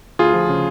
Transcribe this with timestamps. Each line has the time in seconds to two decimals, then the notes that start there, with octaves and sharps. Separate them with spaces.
0.19 D2 F4 G#4
0.34 F3
0.49 C#3